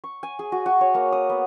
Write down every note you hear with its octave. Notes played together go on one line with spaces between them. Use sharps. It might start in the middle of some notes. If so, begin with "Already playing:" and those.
C#6
G#5
G#4
F#4
F#4
C#5
A#3
D#6
B3